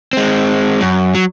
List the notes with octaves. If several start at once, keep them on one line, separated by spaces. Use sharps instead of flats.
G#3 C4
F#2
F#3